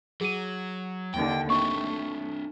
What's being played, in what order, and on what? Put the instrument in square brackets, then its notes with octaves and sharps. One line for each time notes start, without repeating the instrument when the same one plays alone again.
[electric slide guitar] F#3 [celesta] G#4 D#7
[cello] D#2 D3 [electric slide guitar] G5
[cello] A3 [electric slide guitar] C4 D4 [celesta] C#6